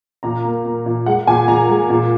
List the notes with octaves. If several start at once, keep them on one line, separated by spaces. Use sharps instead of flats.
A#2 A#5
A#3
A#3
A#2
G#3 F#5
A#2 G#5
A#2 A#5
G#3
A#2